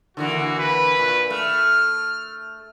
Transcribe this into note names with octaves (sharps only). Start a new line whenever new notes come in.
D3 E3 A#3 F#4
B4
A#2
A3 F6